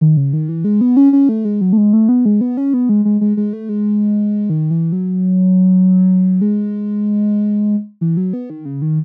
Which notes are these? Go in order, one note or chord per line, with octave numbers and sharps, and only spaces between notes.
D#3
C#3
D#3
E3
G#3
B3
C#4
C#4
A3
G#3
F#3
A3
G#3
A3
B3
G#3
B3
C#4
B3
G#3
G#3
G#3
G#3
A3
G#3
D#3
E3
F#3
G#3
E3
F#3
B3
D#3
C#3
D#3